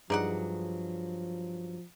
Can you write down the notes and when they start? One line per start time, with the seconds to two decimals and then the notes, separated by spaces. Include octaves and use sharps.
0.10 G2 F3 F#3 D#4 G#4 D5 F#5